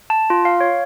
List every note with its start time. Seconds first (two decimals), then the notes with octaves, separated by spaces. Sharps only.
0.10 A5
0.30 F4
0.45 F5
0.60 C#5